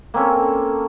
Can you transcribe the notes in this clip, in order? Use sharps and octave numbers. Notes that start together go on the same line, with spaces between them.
A#3 C4 C#4 A4